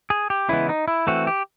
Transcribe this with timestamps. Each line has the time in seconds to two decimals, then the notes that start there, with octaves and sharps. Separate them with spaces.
0.10 G#4
0.30 G4
0.49 C#3 E3 G#3 B3 E4
0.69 D#4
0.88 E4
1.07 E3 A3 C4 F#4
1.27 G4